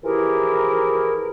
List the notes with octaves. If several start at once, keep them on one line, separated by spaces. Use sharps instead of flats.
E3 F3 E4 G4 G#4 A#4